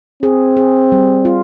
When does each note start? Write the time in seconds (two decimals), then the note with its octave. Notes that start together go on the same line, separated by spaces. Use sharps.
0.23 C4 G#4
0.57 G#4
0.92 G3
1.25 F4